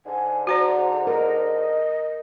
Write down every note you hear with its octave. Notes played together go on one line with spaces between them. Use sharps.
G#2 D3 G#5
F#4 C5 D5 A#5
A#4 D#5